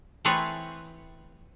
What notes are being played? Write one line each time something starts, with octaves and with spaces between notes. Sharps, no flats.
E3 A3 C4 G#4 B4 C#5